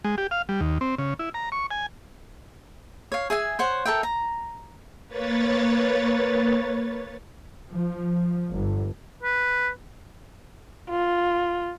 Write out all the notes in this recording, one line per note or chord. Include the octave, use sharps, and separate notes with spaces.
G#3
G4
F5
G3
D#2
C4
C#3
E4
A#5
C#6
G#5
C#5 F5
G#4 E5 G#5
C5 C#5 F#5
A4 A#4 E5 G5
A#5
A#3 B4 C#5 A6
F3
G1
B4
F4